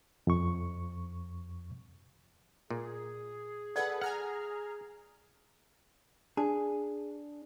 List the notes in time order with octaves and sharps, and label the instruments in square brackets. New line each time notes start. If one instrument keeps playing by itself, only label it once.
[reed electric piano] F2 C#6
[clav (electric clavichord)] A#2 [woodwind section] G#4
[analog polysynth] A4 B4 F#5 [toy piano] D5
[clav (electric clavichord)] F#5 [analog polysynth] G#5 A#5 F6
[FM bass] D4 [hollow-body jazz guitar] G#4